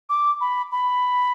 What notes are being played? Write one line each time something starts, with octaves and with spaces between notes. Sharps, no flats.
D6
B5
B5